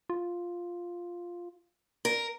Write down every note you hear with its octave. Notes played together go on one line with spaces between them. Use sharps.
F4
A#4